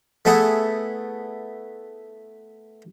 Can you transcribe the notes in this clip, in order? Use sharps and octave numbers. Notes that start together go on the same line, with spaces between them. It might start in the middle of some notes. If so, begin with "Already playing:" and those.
A3 B3 E4 G#4